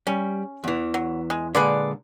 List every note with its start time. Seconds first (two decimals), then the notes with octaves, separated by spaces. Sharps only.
0.07 G3 C#4
0.64 E2 E3
0.94 F#3
1.30 G#3
1.55 A#2 D3 G#3 G#4 B4 D5